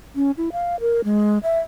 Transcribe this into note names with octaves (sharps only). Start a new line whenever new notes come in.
C#4
E4
F5
A#4
G#3
E5